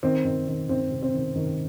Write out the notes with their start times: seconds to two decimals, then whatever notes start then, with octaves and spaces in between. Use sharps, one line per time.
0.03 D#3 C4
0.25 D#3
0.47 D#3
0.69 D#3 C4
0.91 C3
1.03 C4
1.14 D#3
1.36 D#3